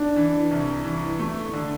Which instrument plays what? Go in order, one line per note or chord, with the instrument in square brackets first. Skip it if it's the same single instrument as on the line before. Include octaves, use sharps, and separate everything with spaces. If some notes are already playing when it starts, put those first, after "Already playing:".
Already playing: [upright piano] D4
[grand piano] E3
C2
E3
A3
D3